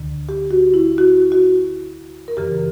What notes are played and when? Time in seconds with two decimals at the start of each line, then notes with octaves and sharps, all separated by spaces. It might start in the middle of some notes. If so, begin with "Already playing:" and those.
Already playing: D2 D3
0.29 G4
0.51 F#4
0.74 E4
0.98 F#4
1.32 F#4
2.28 A#4
2.37 F#2 C#3 E3 G4